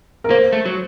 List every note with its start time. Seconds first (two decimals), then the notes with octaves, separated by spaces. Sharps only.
0.24 A#4
0.30 A#3 C5
0.53 A3
0.65 F#3